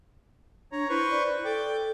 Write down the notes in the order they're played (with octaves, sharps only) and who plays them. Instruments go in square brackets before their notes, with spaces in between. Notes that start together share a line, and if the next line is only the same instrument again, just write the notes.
[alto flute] D4 [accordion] C#5 A#5
[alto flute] E4 [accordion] B4 C5 C#6
[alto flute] D5
[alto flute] A4 [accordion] D5 G5 D6